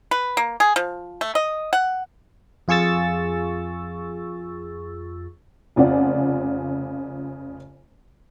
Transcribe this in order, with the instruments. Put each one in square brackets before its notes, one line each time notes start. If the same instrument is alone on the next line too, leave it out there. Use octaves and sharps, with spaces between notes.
[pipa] B4
A#3
G#4
F3
A3
D#5
F#5
[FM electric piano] F2 F4 G#4 C#6 E6 A6
[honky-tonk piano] F1 C#3 F4 D5 F#5